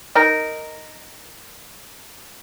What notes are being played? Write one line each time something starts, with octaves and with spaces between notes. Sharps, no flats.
D#4 A#4